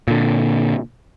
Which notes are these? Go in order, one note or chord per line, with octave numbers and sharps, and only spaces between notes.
A#2 D3